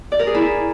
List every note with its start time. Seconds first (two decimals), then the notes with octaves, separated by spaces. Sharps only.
0.12 D5
0.19 A#4
0.27 G#4
0.35 E4